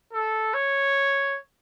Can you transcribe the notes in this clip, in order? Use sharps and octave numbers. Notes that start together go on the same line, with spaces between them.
A4
C#5